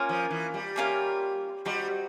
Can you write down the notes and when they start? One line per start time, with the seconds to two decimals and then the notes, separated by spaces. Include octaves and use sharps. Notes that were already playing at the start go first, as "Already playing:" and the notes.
Already playing: A#3 C#4 F4 A#4
0.09 F3
0.31 E3
0.54 G3
0.76 A#3 C#4 F4 A#4
1.65 G3 C4 D#4 F#4